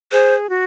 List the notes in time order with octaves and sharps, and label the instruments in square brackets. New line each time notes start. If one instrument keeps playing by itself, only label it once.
[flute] G#4 [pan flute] C5
[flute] F#4